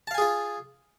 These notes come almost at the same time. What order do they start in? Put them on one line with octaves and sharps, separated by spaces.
A5 F5 G#5 G#4 F4